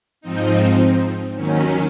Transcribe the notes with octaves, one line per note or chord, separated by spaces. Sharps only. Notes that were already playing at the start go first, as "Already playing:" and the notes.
G#2 F3 C4 D#4
D#2 D#3 F#3 C#4